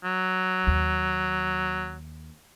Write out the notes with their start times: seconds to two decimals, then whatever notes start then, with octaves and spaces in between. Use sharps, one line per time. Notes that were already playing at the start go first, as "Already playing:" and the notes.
0.04 F#3
0.67 D#2